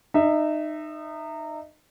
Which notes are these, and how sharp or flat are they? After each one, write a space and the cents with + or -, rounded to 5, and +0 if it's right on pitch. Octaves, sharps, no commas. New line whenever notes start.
D#4 -25 E5 +0